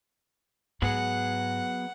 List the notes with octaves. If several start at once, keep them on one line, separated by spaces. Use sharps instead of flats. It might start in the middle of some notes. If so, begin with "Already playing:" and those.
G#2 F#3 B3 G#4 F#5